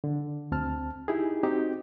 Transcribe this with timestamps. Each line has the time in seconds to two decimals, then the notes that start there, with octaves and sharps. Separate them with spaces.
0.04 D3
0.52 D2 C4 A5 F6
1.08 D#4 E4 G4 G#4
1.43 C4 D#4 F#4 G4